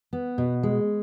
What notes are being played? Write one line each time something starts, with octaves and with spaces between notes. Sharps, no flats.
B3
B2
G#3